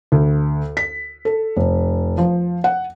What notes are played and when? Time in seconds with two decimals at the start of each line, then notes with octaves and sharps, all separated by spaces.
0.12 D2
0.77 B6
1.25 A4
1.57 F1
2.18 F3
2.64 F#5